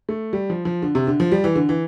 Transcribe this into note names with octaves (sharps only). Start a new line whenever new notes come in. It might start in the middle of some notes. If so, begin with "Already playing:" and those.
A3
G3
F3
F3
D3
C3
D3
F3
G3
E3
D3
E3